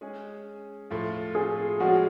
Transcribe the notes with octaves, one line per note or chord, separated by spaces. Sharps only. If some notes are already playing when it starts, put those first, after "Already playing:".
G#3 C#4 G#4
A2 F3 A3 F4
G#4
F3 G#3 C#4 F#4 G#4